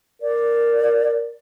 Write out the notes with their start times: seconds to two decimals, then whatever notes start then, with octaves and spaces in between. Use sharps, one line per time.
0.22 A#4 D5